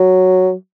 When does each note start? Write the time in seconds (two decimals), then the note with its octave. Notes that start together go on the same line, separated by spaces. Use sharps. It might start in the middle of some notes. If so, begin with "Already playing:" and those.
Already playing: F#3